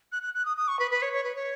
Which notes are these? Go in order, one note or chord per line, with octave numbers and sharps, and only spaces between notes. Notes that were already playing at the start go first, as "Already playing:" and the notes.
F#6
F#6
F#6
D#6
D#6
C#6
B4
B4
C#5
C#5
B4
C#5